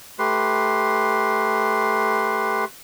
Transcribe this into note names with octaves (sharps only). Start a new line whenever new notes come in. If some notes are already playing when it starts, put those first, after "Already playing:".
A3 G4 B4 C6